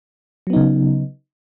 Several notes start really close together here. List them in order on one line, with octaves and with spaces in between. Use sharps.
F#3 B3 D#4 C#3